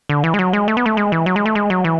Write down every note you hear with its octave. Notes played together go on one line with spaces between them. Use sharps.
D3
E3
G#3
F#3
G#3
A3
B3
A3
G#3
E3
F#3
G#3
A3
G#3
F#3
E3